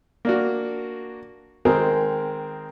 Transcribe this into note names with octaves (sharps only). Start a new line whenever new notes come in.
A#3 D4 F#4
D#3 G#3 C4 A#4